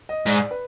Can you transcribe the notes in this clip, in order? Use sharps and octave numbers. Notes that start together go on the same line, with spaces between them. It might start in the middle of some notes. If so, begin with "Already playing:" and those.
D#5
G#2 D5
B4